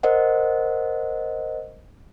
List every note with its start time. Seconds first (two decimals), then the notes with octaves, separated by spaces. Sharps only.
0.03 A#4 C5 D#5 F#5